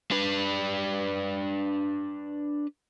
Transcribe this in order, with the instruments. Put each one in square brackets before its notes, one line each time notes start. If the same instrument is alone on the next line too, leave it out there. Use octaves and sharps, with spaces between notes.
[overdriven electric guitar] D4 B4